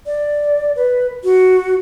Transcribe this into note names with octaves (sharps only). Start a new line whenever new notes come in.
D5
B4
F#4